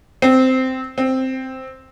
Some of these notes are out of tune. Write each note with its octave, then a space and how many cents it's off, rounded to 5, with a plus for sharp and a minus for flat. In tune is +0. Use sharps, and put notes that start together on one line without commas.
C4 -10
C4 +0